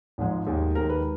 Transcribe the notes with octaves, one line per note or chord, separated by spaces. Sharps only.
G#1 G#2 F3 G#3
D#2 D#3 G#3
D#2 D#3 G#3 A#4
B4